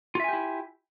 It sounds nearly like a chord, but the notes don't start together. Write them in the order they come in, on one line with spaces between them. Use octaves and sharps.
F4 E5 G#5 G4 E4